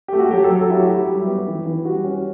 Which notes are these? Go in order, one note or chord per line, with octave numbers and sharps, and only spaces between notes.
A3 G4
F#4
F#3 G4
A4
F#3
A4
E4 G4
F#4
F#3 G4
G3
B3
E3
E3
G3 F#4
C#4